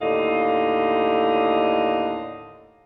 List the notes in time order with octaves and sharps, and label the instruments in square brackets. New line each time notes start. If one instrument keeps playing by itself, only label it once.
[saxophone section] D#2 A2 D3 D#5 F5